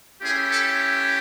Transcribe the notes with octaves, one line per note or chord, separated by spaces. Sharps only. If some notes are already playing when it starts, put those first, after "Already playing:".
A3 C#4 E4 G4 G#4
A4